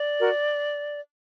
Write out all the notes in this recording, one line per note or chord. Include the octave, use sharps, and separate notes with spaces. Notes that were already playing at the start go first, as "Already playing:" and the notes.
Already playing: D5
F#4 A#4